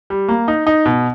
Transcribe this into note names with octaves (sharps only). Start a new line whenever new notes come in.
G3
A#3
D#4
D#4
B2